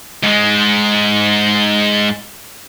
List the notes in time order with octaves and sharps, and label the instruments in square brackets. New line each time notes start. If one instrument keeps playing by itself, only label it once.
[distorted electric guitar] G#2 G#3